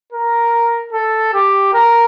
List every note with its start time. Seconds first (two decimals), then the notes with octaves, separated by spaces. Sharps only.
0.12 A#4
0.93 A4
1.34 G4
1.74 A#4